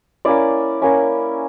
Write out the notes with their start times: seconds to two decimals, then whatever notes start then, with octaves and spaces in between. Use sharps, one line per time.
0.25 A#3 C#4 E4 D5
0.81 A#3 C#4 E4